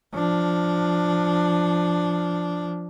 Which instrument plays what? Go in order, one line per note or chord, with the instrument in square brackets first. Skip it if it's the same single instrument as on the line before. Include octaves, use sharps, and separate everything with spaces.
[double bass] F3 D4